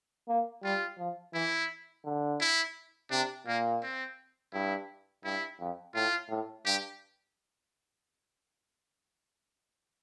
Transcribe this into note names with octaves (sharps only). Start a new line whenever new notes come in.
A#3
G3 F4
F3
E3 E4
D3
E4
C3 D4
A#2 A#3
C4
G2 E4
G2 E4
F2
A2 F4
A2
G2 G4